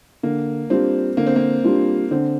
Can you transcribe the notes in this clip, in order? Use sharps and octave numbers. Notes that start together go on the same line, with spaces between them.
D3 A#3
G3 C4 D4 F4
D3 A#3
C4
A#3
G3 D4 F4
D3 C4